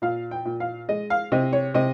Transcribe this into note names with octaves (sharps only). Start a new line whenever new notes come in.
A#2 F5
G5
A#2
F5
G#3 D#5
F5
C3 D#5
C#5
C3 D#5